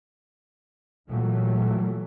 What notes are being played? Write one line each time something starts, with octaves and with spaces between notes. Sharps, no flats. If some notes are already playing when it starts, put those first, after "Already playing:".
A#2 E3 F#3 G3 A3